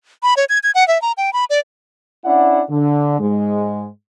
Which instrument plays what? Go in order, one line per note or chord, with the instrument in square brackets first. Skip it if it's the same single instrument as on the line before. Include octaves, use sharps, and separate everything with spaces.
[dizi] B5
C#5
G#6
G#6
F#5
E5
A#5
G5
B5
D5
[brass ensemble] C#4 D4 E4 D5 F#5
D3
G#2 G#3